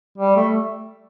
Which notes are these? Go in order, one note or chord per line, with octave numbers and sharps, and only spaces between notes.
G3
A3